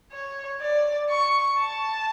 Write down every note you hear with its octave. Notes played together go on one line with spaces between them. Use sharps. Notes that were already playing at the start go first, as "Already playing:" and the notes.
C#5
D5
C#6
A5